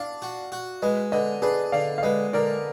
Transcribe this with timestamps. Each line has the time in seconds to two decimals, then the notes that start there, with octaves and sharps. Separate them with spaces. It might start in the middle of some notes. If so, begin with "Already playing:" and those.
Already playing: D4 D5 F5
0.22 F#4
0.52 F#4
0.82 G#3 B4 D#5
1.12 D3 B4 D#5
1.42 D4 G#4 B4
1.72 D3 D5 F5
1.98 F5
2.03 G#3 B4 D#5
2.33 D3 A#4 D5